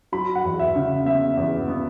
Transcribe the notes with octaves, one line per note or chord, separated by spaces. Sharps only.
F#3 B5
F#5
E2
E5
C#3
B3 E5
E2
B3